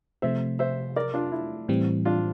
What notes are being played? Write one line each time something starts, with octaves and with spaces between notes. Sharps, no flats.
C3 F3 A3 C5 E5
C5 E5
A#4 D5
D4 F4
E4
A2 E3 G3 C4
D4 F4